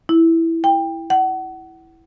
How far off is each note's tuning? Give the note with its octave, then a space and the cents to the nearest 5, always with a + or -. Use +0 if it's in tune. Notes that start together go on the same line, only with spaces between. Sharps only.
E4 +0
G5 +20
F#5 +30